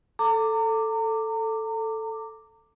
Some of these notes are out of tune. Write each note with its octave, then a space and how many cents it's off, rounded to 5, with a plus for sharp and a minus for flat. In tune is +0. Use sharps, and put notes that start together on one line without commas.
A4 +5 A#5 -35 D6 +0